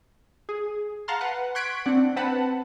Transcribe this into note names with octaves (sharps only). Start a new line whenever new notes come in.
G#4
F5 F#5 A5 A#5 C6 F6
B4 F#5
C6 C#6 F#6 G#6 B6 D7
C4 D4 F#5
C4 B4 F#5 A5 B5